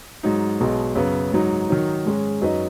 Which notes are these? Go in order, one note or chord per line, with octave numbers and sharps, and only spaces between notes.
G#2 F#3 D#4
B1 B2 G#3
F#2 C#3 B3
G#2 F#3 D#4
D#3 F#3 D#4
G#2 G#3 C#4 G#4
F#2 F#3 D#4 B4 D#5